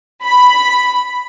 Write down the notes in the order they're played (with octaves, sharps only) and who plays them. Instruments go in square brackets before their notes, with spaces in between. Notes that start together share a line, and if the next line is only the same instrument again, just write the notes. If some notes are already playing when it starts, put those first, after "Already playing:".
[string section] B5